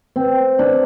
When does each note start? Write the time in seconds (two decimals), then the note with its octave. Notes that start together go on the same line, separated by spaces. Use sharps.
0.16 C4
0.59 D4